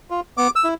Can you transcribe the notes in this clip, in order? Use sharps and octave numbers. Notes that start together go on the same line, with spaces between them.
F4
B3 D6
E6
E4